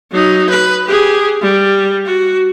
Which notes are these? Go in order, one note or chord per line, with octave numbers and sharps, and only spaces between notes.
F#3 D#4
B4
G4 G#4
G3
F#4